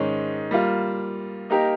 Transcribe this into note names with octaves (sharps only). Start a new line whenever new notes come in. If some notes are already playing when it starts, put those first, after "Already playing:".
Already playing: G#2 D#3 G#3 C#4
G3 A#3 F4
A#3 D#4 G4 A#4